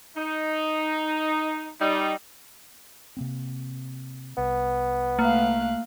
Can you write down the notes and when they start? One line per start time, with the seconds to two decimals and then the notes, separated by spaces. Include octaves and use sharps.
0.17 D#4
1.81 G3 D#4
3.17 C3 A#3 C4
4.38 C2 B3
5.19 A3 A#3 F5 F#6